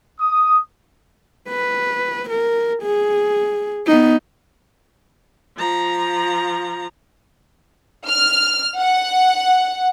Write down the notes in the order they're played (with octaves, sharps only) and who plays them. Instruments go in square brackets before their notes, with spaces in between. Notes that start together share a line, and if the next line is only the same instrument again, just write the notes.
[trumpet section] D#6
[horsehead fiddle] B4
A#4
G#4
B3 D#4
[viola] F3 A#5
[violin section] F6
F#5